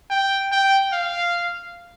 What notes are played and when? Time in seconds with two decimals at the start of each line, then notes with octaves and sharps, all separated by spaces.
0.10 G5
0.51 G5
0.93 F5